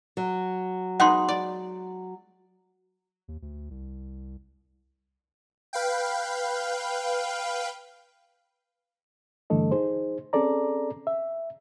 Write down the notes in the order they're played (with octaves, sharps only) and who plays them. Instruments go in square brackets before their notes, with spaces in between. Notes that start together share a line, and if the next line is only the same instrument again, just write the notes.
[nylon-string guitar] F#3
[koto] G#3 B3 D#4 [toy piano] F#5 C6
[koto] D5
[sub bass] D#2
D2
C2
[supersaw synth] B4 F5 G5
[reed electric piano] G2 D3 E3 A3 A4 D#5
D#4 G#4 C5
C4 C#4 G#4 A4 D5 A#5
E5